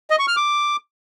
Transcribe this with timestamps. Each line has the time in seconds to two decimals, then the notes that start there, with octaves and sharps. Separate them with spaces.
0.10 D#5
0.19 C#6
0.28 F6
0.37 D6